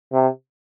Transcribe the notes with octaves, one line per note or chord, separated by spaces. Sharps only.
C3